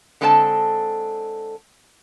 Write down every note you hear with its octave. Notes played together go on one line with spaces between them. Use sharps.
D3 G#3 C4 A4 F5 A5